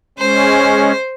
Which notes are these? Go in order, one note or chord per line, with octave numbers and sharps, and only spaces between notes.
G#3 C#4 C5